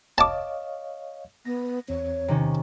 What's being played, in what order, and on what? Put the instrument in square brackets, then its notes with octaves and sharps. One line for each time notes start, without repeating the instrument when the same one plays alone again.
[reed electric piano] C#5 D#5 F5 [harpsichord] A5 D6
[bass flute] B3 [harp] A#6
[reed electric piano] E2 C4 [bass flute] C#5
[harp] C3 D#3 C#4